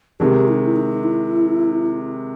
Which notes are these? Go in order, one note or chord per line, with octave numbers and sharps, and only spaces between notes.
C3 D#3 G#3 G4
E4
D#4
E4
D#4
E4